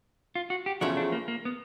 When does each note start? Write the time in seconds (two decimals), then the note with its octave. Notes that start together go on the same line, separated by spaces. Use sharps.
0.35 F4
0.50 F#4
0.66 G4
0.81 E2 C#3 F3 A3 F#4
0.97 D4
1.12 A#3
1.28 A#3
1.45 B3